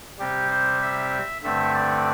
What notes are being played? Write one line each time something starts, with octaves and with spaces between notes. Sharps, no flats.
C3 G3 C4 G4
C5
E5
G2 D3 A3 C4 E5
D5